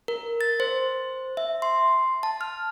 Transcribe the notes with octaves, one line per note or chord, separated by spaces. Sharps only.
A#4
A6
C5
E5
C6
A5
F6